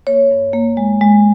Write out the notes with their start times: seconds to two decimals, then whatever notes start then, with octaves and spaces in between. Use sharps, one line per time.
0.07 A#3 C#5
0.31 G2
0.53 A#3
0.77 G#3
1.01 G#3